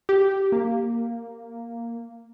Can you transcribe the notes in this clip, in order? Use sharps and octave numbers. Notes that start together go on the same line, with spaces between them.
G4
A#3